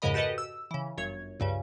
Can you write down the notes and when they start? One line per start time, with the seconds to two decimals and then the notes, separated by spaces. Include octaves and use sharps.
0.02 F2 G#2 C#3 A#4 D#5 B5
0.14 F#4 G4 A4 B4 D#5
0.38 E6
0.71 C#3 E3
0.98 G1 F#2 C#5 G#6
1.40 C#2 G2 C#3